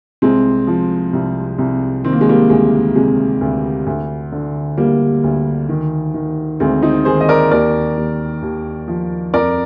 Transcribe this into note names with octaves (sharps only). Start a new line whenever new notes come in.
C2 G#3 C4
F3
C2
C2
D#3 C4
A#3
G#3
G3 A#3
D2 G#3
C3 G#3
D2
D2
D3
D2 G3 A#3
D2
D#3
D#3
D2 G#3 C4
C4 D#4
D#3 G#4 C5
D#5
A#4 D5
D#2 A#4 D5
D#2
D#2
F3
F2 A#4 D5